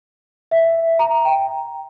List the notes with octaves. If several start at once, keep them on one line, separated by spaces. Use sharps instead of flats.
E5
A#5
G5